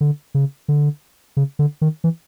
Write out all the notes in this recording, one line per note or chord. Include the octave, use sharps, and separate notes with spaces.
D3
C#3
D3
C#3
D3
D#3
E3